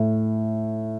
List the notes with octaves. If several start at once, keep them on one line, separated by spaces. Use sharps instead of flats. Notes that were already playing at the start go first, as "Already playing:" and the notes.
Already playing: A2